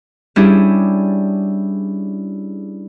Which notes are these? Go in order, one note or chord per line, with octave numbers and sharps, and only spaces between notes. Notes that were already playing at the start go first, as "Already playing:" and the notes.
G3 C#4 D4 E4 G4 G#4